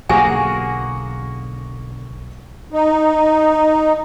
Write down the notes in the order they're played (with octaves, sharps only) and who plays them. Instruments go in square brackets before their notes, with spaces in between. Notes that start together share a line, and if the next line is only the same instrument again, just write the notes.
[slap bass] B1 D3 [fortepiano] A#3 F#4 G#4 [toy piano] G#5
[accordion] D#4